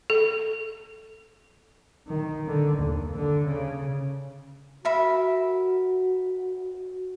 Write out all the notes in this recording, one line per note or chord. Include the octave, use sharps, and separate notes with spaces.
A4
D#3
D3
D#2
D3
C#3
F#4 A#4 E5 B5